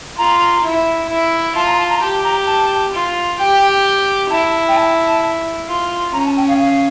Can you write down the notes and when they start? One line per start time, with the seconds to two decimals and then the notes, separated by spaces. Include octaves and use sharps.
0.18 F4 A#5
0.64 E4
1.09 E4
1.56 F4 A5
1.67 A#5
1.79 A5
1.90 A#5
2.01 G4 A5
2.24 A#5
2.47 A5
2.93 F4
3.39 G4 G5
4.30 E4 A5
4.68 G5
4.77 A5
5.68 F4
6.13 C#4 A#5
6.26 A5
6.37 G5
6.48 F5
6.60 F5